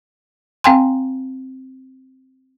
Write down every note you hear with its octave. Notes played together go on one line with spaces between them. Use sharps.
C4 F5 G5 G#5 C6